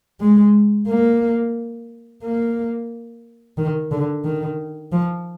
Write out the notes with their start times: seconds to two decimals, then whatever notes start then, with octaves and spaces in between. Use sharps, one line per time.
0.21 G#3
0.88 A#3
2.23 A#3
3.58 D#3
3.91 D3
4.25 D#3
4.92 F3